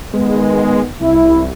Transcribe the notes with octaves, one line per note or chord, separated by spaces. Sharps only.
D#3 G#3 B3
C2 E4